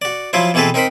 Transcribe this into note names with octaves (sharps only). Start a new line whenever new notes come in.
F#4 D5
F3 F#3 E4 F4 C5
B2 E3 C4 G#4 A4 B4
C4 D#4 A#4 C5 B5